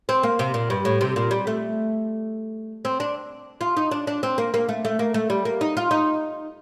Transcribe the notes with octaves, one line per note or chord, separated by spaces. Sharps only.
C4
A#3
C3
A#2
G2
A2
C3
A#2
G3
A3
C4
D4
F4
D#4
D4
D4
C4
A#3
A#3
A3
A3
A#3
A3
G3
A#3
D#4
F4
D#4